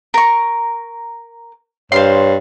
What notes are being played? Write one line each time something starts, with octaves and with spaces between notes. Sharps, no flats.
A#4 C#6
G2 C5 C#5 F5 C6